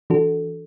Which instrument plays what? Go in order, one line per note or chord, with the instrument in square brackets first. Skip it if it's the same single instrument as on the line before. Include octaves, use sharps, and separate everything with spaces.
[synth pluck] E3 D4 F#4 A4